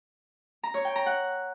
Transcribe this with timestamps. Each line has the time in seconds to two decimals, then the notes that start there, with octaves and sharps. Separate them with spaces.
0.63 A#5
0.74 C#5
0.85 G5
0.96 A#5
1.06 F#5